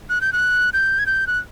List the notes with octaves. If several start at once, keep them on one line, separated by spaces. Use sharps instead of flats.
F#6
G6
F#6
G6
G#6
G6
F#6